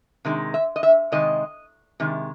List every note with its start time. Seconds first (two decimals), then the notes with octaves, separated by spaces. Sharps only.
0.25 C3 D#3 G#3
0.54 E5
0.76 D#5
0.83 E5
1.12 C3 D#3 G#3 D#5
2.00 C3 D#3 G#3